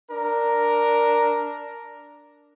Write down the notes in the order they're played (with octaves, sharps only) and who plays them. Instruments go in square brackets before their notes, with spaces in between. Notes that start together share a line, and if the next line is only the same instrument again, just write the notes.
[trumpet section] D4 A#4